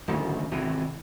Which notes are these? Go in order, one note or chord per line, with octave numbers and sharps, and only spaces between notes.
D1 G#1 D2 C#3
G#1 C3 E3